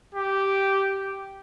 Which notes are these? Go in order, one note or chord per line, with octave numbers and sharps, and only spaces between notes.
G4